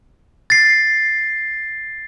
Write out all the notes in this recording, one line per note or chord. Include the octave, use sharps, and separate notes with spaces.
A6 C7